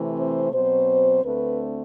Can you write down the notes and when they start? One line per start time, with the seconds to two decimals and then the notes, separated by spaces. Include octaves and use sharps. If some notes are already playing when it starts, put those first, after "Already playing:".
Already playing: C3 E3 A3 C4
0.17 C5
0.53 B2 F#3 C4 C5
1.24 D2 D3 A3 C4 B4